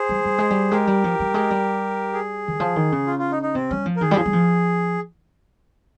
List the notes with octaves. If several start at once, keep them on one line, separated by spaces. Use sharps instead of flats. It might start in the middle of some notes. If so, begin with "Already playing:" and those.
Already playing: G#4 C5
G3
G3
G#3
G3
G#3 G4 A#4
G3
F3
G3
G#3
G3
G#4
D#3
F3
D#3
C#3
F4
F4
D#4
D#4
C3 C4
G3 C#4
F3
A#4
D#3 G#4
G3
F3
G3
F3